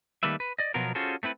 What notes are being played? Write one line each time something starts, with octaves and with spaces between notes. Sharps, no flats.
D#3 G3 A3 A#3 B4 E5
B4
D5 D#5
B2 F3 F#3 B3 F4 A#4
C#4 F4 F#4 G#4 A4 C5
A3 C4 E4 B4